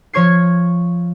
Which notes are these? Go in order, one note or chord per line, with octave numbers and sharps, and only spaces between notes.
F3 C#5 C#6 G#6 C7